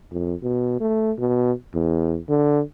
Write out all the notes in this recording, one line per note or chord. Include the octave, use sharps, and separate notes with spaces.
F2
B2
A3
B2
E2
D3